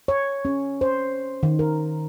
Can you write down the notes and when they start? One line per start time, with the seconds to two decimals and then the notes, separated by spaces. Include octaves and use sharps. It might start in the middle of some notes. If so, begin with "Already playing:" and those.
0.08 C#5
0.45 C#4
0.81 C5
1.43 D#3
1.59 A#4